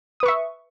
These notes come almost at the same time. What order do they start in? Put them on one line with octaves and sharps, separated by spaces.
D#6 B4 C#6 E5